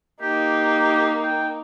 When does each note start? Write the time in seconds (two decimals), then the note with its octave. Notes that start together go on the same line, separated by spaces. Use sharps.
0.22 A#3 D#4 G4
1.23 G5